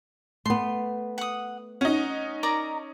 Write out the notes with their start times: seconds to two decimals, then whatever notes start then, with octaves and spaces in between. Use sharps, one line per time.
0.46 A3 B3 C6
1.18 F#5 D#6
1.81 C#4 D#4 F#5
2.43 A#4 D5 A#5